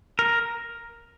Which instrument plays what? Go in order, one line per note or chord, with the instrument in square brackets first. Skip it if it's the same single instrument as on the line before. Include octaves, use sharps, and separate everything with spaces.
[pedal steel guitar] A#4